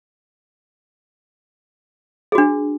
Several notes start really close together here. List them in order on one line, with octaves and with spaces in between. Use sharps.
G#4 F#4 D4